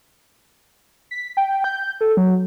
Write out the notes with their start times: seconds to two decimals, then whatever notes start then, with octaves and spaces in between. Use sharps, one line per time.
1.11 B6
1.37 G5
1.64 G6
2.01 A4
2.17 F#3